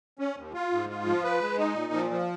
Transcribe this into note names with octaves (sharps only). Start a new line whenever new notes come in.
C#4
D#2
F4
G#2
F4
F3
B4
G#3
D#4
A#2
F3
F3